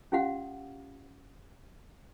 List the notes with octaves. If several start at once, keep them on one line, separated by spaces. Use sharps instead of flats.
C#4 F4 G4 F5 F#5